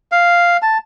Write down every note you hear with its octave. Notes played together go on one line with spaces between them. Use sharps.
F5
A5